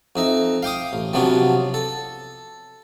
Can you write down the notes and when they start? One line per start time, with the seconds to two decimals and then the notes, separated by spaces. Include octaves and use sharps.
0.16 F2 D#4 E5
0.63 F5 G5 D6 D#6
0.93 A1
1.14 C3 F3 F#3 B3 C#4 D4
1.74 A4